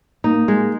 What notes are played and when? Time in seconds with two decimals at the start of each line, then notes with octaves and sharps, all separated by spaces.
0.24 A#3 D#4
0.48 G#3